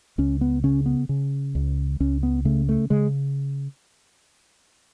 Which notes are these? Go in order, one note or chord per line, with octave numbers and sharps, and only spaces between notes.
C#2 C#4
B3
C#3 C#4
B3
C#3
C#2
C#2 C#4
B3
C#3 A3
A3
C#3 G#3